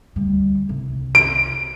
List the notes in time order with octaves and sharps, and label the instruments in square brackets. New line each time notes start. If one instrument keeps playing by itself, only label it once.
[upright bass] D2 G3
C2
[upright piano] D7